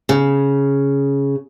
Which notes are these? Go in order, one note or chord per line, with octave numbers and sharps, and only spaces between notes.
C#3